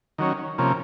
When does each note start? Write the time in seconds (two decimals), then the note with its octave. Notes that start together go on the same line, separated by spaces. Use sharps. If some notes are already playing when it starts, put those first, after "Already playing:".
0.18 D#3 F#3 C#4
0.58 C3 F3 A#3 C#4